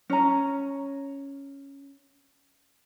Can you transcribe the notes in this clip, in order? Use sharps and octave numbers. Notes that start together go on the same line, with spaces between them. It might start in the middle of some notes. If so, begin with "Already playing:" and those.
C#4 A#5